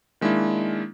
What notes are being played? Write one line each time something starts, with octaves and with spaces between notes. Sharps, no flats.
D#3 G#3 A#3 D4 E4